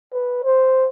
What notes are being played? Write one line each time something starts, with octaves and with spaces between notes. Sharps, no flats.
B4
C5